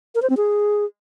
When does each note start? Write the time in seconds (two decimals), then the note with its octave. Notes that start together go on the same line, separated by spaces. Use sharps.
0.15 A#4
0.22 C5
0.30 C4
0.37 G#4